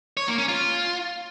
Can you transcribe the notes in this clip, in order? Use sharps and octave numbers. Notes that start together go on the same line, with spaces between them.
C#5
A#3
C#4
F4